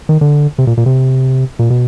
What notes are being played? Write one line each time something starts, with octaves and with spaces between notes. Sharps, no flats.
D#3
D3
C3
A#2
A#2
C3
A#2
B2